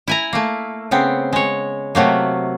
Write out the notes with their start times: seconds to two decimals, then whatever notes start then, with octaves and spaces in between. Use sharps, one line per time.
0.07 E4 G#5 A#5
0.33 A3 A#3
0.91 C#3 B3 C4
1.33 G#3 C#5
1.95 C3 F#3 A3 A#3